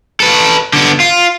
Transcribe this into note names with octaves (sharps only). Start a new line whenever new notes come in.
A4 B4
D3 B3
F4